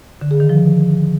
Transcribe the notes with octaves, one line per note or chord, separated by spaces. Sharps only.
D3
G#4
D#3
F3